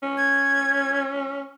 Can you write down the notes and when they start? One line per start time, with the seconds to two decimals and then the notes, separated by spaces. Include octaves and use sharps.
0.03 C#4
0.17 G#6